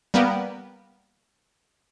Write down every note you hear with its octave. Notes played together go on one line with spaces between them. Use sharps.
G3 A#3 B3